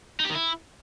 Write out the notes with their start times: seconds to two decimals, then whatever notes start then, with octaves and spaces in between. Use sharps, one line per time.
0.20 D#4
0.25 G4
0.30 D#3
0.35 E4